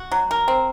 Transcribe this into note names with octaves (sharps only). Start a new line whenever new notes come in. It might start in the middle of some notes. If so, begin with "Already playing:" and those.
Already playing: F#4
F#3
A#4
C4